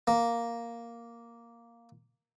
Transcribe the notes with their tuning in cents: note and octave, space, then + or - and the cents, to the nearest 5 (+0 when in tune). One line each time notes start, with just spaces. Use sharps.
A#3 +0